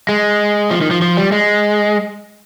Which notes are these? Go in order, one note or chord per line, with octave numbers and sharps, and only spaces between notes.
G#3
F3
D#3
F3
F3
G3
G#3